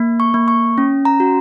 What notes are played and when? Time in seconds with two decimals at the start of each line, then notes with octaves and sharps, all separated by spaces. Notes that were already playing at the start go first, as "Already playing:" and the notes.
Already playing: A#3
0.20 C#6
0.34 A#3
0.48 C#6
0.78 C#4
1.05 A#5
1.20 F#4